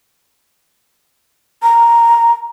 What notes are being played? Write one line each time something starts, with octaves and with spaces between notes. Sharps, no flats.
A#5